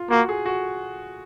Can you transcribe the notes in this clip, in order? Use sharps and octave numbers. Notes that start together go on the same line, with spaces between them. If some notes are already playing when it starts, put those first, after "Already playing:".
Already playing: F4
A#3 F#4
G#4
F#4